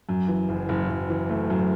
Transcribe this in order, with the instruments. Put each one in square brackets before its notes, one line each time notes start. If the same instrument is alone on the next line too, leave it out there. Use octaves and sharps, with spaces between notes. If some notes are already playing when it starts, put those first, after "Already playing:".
[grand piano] F#2
E3
F#1
F#1
F#1
E3
A3
F#2